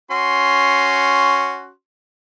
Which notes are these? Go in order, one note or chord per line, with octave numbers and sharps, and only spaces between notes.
C#4 F#4 C6